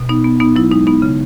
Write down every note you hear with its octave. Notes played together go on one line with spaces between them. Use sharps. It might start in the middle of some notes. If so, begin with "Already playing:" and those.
Already playing: B2
B3 D#4
B3
B3 D#4
F#3 E4
G#3 D#4
B3 D#4
C#3